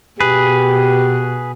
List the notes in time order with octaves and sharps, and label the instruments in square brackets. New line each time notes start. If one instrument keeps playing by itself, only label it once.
[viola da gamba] B2 [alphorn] G4 [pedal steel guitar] G#4 B4